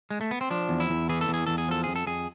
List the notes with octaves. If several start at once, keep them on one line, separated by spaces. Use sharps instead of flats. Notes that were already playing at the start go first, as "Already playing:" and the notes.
G#3
A3
B3
C4
F3 D4
E2
E4
E2
E3 G#4
A4
E2
G#4
E2 A4
G#4
F3 A4
F2 G#4
A4
F2 G#4